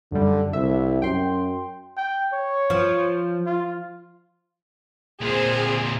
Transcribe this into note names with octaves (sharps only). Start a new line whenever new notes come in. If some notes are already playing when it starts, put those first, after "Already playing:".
F#2 D3 G3
C2 E5
F#2 G5 C6
G5
C#5
F3
F4
A#2 C4 G#4 C5